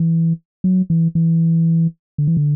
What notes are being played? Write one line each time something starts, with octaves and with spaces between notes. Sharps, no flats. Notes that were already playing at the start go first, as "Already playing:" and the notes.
Already playing: E3
F#3
E3
E3
D3
E3
D3